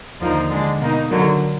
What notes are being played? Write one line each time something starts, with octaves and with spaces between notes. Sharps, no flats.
D#2 D3 F3 A#3 D#4
D3 G#3 D4
B2 A#3 D#4
D3 F#3 A#3